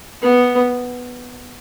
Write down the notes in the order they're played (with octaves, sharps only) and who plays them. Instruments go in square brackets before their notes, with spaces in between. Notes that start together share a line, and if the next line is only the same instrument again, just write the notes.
[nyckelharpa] B3